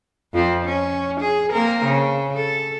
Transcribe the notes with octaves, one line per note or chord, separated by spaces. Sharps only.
F2 F3 C4
C#4
G#4
A#3 C4 A#4
C#3
A4